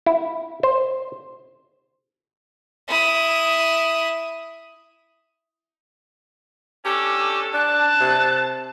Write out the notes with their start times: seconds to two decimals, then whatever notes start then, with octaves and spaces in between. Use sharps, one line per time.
0.06 E4
0.63 C5
2.88 E4 D#6
6.85 C#4 D4 G4 A4
7.54 D4 A5 F#6
8.01 C3